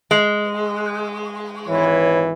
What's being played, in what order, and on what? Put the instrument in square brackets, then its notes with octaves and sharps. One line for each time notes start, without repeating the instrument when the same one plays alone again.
[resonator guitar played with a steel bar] G#3
[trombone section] G#1 E3 B4 [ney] C#5